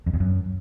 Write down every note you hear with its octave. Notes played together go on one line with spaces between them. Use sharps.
F2
E2
F#2